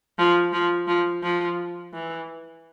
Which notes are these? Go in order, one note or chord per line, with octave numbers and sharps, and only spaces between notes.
F3
F3
F3
F3
E3